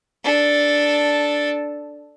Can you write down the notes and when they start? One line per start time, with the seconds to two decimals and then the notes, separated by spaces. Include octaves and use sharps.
0.23 D4 A4